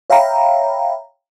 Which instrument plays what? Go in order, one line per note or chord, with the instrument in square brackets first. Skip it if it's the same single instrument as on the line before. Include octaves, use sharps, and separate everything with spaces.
[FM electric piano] C#5 E5 F5 G5 A#5 B5